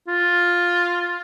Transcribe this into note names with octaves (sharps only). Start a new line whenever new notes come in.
F4